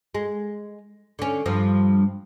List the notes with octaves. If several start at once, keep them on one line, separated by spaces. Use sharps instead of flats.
G#3
D3 C#4
G2 F3